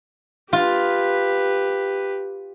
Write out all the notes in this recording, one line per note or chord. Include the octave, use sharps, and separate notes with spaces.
F4 G4 B4